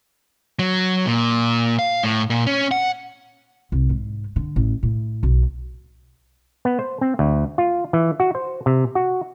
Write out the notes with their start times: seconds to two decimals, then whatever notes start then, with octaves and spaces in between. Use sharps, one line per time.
0.59 F#3
1.07 A#2
1.79 F5
2.04 A2
2.30 A#2
2.47 C#4
2.71 F#5
3.72 C2
3.89 G#2
4.36 D3
4.56 A1
4.83 A2
5.23 B1
6.65 B3
6.79 C5
7.01 C4
7.19 D2
7.58 F4
7.93 E3
8.20 F#4
8.35 C5
8.66 C3
8.95 F#4